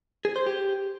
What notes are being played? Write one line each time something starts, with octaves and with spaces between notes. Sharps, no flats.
G#4
C5
G4